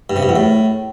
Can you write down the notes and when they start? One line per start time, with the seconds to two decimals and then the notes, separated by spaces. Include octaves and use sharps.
0.10 G2
0.16 C3
0.23 G2
0.29 E2
0.36 A2